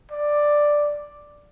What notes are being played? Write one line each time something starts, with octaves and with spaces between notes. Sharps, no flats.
D5